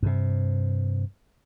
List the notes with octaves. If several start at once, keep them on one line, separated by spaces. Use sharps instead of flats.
G2 C3